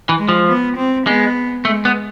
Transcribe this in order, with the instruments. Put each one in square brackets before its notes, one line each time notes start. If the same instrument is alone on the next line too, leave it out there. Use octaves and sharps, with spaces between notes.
[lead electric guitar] E3
[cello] G#3
[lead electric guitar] F3
[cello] B3
C4
[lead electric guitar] G#3 [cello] B3
[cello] G#3 [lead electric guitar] A3
[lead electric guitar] B3